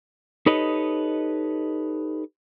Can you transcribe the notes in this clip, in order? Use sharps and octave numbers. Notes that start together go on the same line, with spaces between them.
D#4 G4 A4 B4 C#5 D#5